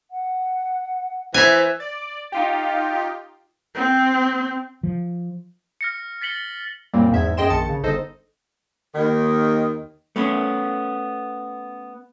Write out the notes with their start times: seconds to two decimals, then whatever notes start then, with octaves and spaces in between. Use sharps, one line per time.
0.11 F#5
1.34 E3 C5 E5 G#5
1.80 D5
2.32 D#4 F4 G4
3.75 C4
4.83 F3
5.81 F6 A#6 C#7
6.21 A6 B6 C#7 F#7 G7
6.93 F#2 A#2 G3 A#3 C4
7.11 E2 G#2 E5 G#6
7.37 F#2 G#4 D#5 G5 C6 E7
7.50 A#1 D#3 A5 A6 C#7
7.69 C#3
7.83 G1 D#4 A4 C5 D#5
8.94 D#2 D#3
10.16 A3 B3 C#4